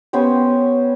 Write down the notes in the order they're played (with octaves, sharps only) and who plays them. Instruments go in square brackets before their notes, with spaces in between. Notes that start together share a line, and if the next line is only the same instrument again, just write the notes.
[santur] B3 C#4 G4 C5